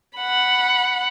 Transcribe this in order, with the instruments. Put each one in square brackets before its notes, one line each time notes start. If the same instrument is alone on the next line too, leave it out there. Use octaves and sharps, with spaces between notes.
[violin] F#5 B5